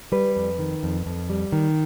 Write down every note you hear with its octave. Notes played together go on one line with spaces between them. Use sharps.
G3 B4
F2
D#3
F2
F2
G3
D#3